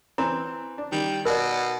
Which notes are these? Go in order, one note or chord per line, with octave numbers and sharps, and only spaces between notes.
E3 C4 A#5
D4
D#3 G3
B2 A#4 D5